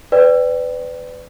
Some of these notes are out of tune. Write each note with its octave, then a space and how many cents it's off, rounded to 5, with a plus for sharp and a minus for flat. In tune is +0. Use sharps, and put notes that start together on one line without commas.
B4 +30 D5 +0 G5 +0